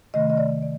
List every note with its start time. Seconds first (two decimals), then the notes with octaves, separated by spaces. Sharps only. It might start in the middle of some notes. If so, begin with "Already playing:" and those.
0.14 C3 D#3 A3 D#5
0.30 D#5
0.37 D5
0.62 D5